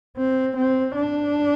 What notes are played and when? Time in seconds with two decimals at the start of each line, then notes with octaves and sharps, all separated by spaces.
0.17 C4
0.56 C4
0.95 D4